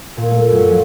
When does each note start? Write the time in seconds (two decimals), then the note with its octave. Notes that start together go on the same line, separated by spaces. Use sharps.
0.17 A#2
0.31 A3
0.51 F#2
0.69 F3